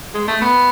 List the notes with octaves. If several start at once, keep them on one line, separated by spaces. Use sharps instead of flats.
G#3
A3
B3